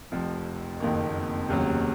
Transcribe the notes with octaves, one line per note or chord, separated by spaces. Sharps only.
F1 F2 F3
F#1 F2 D#3 A#3
F1 D#2 C#3 F#3